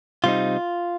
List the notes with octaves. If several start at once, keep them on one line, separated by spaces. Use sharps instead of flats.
C3 G3 C4 D#4 F4